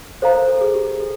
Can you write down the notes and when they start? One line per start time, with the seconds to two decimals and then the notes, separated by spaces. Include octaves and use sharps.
0.22 A4 C5 F5 A#5
0.35 A#4
0.48 A4
0.61 G#4
0.74 G4
1.00 A4